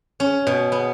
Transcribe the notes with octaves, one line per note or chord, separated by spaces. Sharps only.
C#4
B2
B3